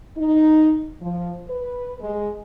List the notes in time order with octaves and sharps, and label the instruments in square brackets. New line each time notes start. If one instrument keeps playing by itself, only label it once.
[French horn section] D#4
F3
B4
G#3